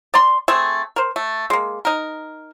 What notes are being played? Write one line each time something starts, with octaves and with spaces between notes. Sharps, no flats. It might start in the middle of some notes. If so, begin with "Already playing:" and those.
D5 A#5 C6
A3 C4 G#4 E5
A#4 C5
A3
G#3 A#3
D#4 A#4